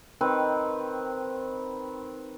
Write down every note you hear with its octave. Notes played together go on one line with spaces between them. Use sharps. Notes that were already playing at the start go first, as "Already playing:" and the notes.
D#3 C4 B4